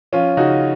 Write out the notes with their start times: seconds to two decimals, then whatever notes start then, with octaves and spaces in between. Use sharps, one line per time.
0.12 F3 C#4 F4
0.37 C#3 D#4 F#4